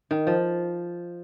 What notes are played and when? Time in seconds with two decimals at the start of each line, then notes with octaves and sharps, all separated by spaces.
0.11 D#3
0.27 F3